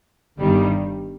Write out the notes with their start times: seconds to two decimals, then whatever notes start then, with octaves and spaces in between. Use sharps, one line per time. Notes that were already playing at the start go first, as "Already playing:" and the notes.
0.40 G1 G2 D#3 G3